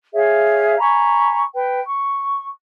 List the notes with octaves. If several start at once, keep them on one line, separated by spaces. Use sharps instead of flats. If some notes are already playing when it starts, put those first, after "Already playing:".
G#4 C#5 E5 F5
G#5 A#5 B5 C#6
B4 G5
C#6